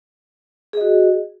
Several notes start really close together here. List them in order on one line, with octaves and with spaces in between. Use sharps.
G#4 D#5 F#4